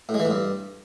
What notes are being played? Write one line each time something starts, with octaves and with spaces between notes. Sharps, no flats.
A2
G#3
E3
A2
G2